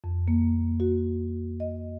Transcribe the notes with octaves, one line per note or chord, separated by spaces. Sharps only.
F2
A#3
F#4
D#5